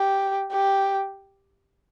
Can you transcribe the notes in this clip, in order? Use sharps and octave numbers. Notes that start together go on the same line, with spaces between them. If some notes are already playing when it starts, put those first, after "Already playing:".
Already playing: G4
G4